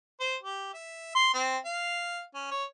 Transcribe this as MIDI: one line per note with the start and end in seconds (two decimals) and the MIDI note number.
0.20 0.36 72
0.43 0.69 67
0.74 1.11 76
1.15 1.30 84
1.34 1.57 60
1.65 2.22 77
2.34 2.49 61
2.51 2.64 73